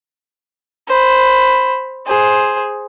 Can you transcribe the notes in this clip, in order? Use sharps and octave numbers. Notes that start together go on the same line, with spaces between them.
C5 B5
G#4 C5